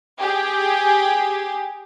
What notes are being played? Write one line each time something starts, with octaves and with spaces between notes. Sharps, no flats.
G4 G#4